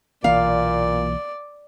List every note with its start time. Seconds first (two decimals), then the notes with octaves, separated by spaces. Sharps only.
0.24 B1 A#2 E3 A#3 D5 F5